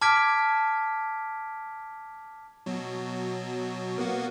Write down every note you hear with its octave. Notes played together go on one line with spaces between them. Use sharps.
A5 D6 F6 G#6 B6 D7
B2 F#3
A#3 B3 F#4